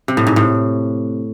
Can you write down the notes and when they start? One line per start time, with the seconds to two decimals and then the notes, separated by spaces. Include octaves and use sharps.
0.08 C3
0.17 A2
0.27 G#2
0.36 A2